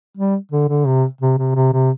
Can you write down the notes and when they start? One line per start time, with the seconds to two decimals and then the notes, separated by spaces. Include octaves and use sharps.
0.17 G3
0.52 D3
0.69 D3
0.86 C3
1.21 C3
1.38 C3
1.55 C3
1.73 C3